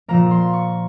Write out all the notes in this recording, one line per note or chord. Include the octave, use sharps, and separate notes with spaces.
A#2 F3 A#3 A#5
C6
C#6